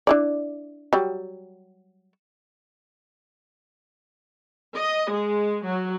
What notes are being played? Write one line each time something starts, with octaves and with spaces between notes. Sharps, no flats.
D4 E4 D5
F#3 G3
D#5
G#3
F#3